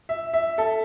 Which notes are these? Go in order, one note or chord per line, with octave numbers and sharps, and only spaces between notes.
E5
E5
A4